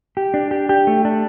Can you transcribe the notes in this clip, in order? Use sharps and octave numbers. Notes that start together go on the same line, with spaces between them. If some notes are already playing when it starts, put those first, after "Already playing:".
G4
D4
G4
G4
A3
D4